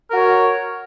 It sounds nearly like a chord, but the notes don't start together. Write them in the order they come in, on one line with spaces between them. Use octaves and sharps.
A#4 F#4 C#5